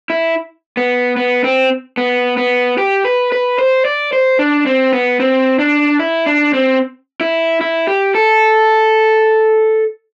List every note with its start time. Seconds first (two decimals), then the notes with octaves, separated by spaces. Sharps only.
0.10 E4
0.77 B3
1.17 B3
1.44 C4
1.97 B3
2.37 B3
2.78 G4
3.05 B4
3.32 B4
3.59 C5
3.85 D5
4.13 C5
4.39 D4
4.66 C4
4.93 B3
5.20 C4
5.59 D4
5.99 E4
6.27 D4
6.53 C4
7.21 E4
7.61 E4
7.87 G4
8.15 A4